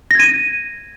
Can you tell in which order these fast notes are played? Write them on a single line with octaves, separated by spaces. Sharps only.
A#6 G#6 D#7